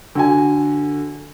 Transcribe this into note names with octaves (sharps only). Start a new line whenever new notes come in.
D3 F#4 G#5